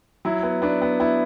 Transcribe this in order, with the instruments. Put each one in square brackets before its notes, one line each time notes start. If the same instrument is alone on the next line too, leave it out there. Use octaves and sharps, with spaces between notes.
[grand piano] F#3 E4
B3
B3 D4
B3
B3 E4